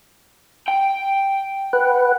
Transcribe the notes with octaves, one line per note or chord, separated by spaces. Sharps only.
G5
B4 F#5